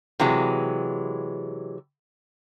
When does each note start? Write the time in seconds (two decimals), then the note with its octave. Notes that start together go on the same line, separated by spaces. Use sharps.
0.20 C3 E3 F#3 G#3